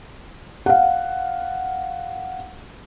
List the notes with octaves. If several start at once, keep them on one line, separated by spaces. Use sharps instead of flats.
F5 F#5